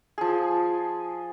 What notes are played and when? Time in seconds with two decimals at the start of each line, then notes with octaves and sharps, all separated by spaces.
0.18 F3 G#4